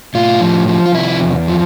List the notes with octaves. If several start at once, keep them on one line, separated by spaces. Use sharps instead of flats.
A2 F4
F3
F3
F4
C3 E4
E2
F3